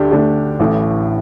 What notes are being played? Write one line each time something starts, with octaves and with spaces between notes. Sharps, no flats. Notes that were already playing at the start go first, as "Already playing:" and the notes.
Already playing: D2 D3 A3 D4 G4
D2 D3 A3 D4 G4
A1 A2 E3 A3